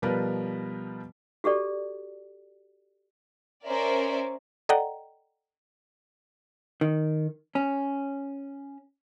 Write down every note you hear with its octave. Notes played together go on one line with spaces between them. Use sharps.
B2 F3 G3 A#4 B4
F#4 G4 A4 D5
C#4 A#4 C5 D5 E5
A4 D5 D#5 F#5 G5 A#5
D#3
C#4